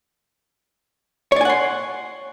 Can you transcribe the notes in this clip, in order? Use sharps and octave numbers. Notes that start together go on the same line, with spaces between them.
C#5 D5 F#5 G#5 C6